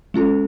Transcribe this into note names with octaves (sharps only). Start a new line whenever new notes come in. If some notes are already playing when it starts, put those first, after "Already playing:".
G#3 C#4 F4 A4